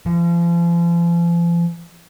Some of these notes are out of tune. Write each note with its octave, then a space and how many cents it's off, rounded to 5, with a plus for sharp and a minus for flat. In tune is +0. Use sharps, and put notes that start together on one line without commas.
F3 -40